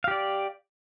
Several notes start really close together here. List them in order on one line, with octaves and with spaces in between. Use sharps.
F5 G4 D5